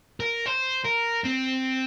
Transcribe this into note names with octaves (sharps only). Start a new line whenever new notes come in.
A#4
C5
A#4
C4